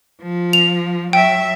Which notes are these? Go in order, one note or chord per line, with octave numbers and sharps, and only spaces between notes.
F3
F7
F#3 E5 G5